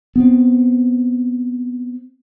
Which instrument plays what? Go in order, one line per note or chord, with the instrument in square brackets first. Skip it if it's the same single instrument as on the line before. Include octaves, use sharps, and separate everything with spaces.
[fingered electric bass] B3 C4